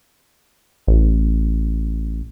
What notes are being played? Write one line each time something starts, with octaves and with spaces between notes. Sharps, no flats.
A1